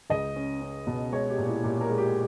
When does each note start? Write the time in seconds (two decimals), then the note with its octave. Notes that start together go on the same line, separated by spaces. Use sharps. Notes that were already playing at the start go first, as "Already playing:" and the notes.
0.10 C#2 D#5
0.36 C#4
0.61 C#4
0.87 B2
1.12 G#3 C#5
1.30 G4
1.38 A#2
1.47 E4
1.64 A#2 G4
1.81 A#4
1.89 G#3
1.98 G4